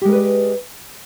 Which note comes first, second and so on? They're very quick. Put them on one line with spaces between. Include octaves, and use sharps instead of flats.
G4 G#3 A#4 B4 D5